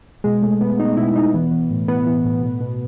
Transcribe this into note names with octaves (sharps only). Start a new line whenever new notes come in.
B2 G#3
B2 A3
B2 B3
B2 D#4
B2 E4
B2 D#4
E3 B3
E3
A2
E3 B3
E3
A2
B2
B2